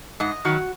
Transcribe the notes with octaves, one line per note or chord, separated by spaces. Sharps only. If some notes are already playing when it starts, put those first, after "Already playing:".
G#2 D#5
D#3 F#3 F#4